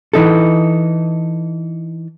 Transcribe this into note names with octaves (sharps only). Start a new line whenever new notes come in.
E3 D#4 A4